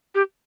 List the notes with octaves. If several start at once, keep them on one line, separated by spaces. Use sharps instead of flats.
G4